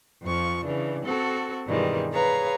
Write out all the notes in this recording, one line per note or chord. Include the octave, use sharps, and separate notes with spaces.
F2 F3 C#6
C#3 E3 D4
C4 F#4 A4
G2 B2 D#3 E3 G3 G#3
G#4 B4 C#5 F5 A#5